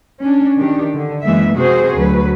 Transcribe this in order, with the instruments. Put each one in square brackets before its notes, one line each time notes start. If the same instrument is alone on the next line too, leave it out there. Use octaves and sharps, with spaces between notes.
[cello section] C#4 D4
D#3 D4 G4
D3
F#2 E3 G#3 A#3 E5
C3 F#4 G#4 C5
D2 F#3 B4